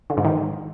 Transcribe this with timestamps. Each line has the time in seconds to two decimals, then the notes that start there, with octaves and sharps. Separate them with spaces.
0.10 D3
0.17 G#2
0.25 D#3